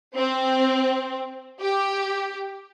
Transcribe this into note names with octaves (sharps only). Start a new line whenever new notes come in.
C4
G4